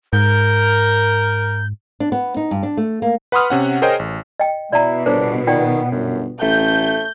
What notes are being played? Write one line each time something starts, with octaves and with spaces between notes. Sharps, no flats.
G#2 A#4 G6
D4
B3
D#4
G2
D4
A3
A#3
B4 F#5 B5 C6 D#6 F6
C3 C#4 F#5
G#4 A#4 C5 C#5 D#5 G5
A1
D#5 G5
B2 E4 D5 A#5
G1 D4 A#4 C5 C#5
D#3 B3 F4 D5 G5
G1 F#2
A1 A3 G6